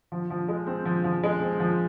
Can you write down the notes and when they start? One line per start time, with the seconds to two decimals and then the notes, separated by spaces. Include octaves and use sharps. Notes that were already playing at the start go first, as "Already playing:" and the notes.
0.12 F3
0.30 F3
0.48 G#3
0.67 C4
0.85 F3
1.04 F3
1.24 G#3
1.42 C4
1.60 F3